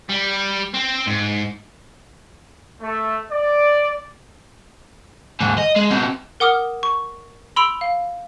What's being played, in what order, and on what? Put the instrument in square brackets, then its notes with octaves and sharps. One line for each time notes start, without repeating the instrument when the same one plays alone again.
[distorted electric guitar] G3
C4
G#2
[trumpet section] A3
D5
[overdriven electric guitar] D#2 G#2
D#5
G#3
B2 C4
[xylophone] A#4 F#5 D6 D#6 F6
C#6
B5 C6 E6 D7 F7
F5